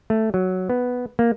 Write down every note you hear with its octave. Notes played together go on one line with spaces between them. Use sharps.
A3
F#3
B3
A#3